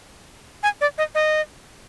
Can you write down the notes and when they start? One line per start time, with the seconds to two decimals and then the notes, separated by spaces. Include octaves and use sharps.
0.63 G#5
0.81 D5
0.98 D#5
1.15 D#5